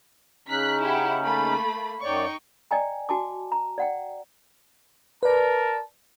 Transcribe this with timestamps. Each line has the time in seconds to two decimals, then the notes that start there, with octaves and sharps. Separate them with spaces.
0.48 C#3 C#4 D#4 F#6 B6
0.81 E4 G4 F#5
1.21 A3 A#3 B5
2.03 F#2 D#4 C#5 D5 G5 C#6
2.71 D5 D#5 G5 G#5 A#5
3.09 F#4 G#5 A5 D6
3.52 A#5
3.78 D5 F#5 G5
5.23 A#4 B4 D5 A5